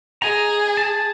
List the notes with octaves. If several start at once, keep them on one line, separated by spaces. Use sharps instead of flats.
G#4 D#5 A#5
A5